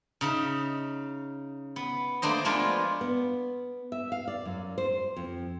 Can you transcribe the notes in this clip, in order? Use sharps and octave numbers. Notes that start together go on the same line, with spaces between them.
C#3 D#4 E5
B3
A3 A#3 D4 C5 D#5
F3 G#3 A#3 B3 D4 F4
B3
E5
F5
D5
F#2
C5
F2